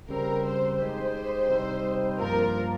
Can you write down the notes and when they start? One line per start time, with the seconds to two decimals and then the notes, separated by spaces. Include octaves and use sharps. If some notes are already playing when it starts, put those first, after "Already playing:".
0.09 C#3 G3 C4 A#4
0.44 C5
0.79 G#3 D#4 G4 C5
1.49 C3 G3 C4 D#4
2.19 G2 F3 A#3 F4 A#4